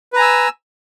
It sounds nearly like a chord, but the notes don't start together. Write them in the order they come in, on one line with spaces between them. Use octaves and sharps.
B4 A#5 G#5 E6